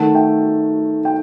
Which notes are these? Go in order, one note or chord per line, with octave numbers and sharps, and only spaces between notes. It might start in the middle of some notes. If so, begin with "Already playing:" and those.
Already playing: D#3 A3 F#5 A5
E5 G5
G5